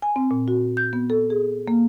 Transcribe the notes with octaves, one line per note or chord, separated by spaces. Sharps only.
G#5
C4
A#2
F#4
G6
B3
A4
G#4
A#3